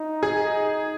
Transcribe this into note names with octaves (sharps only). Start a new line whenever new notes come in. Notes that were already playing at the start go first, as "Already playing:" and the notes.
Already playing: D#4
G#4